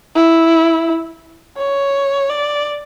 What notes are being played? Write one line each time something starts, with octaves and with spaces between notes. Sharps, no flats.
E4
C#5
D5